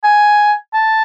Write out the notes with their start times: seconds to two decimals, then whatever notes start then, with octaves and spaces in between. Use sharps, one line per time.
0.04 G#5
0.74 A5